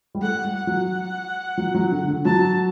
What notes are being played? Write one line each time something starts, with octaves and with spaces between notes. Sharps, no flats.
G3
A3 F#5
G3
F#5
F#3
F#3
F#3
D3
D3
F#3 A5